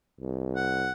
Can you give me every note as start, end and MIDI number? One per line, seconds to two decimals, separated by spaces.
0.20 0.91 36
0.56 0.92 78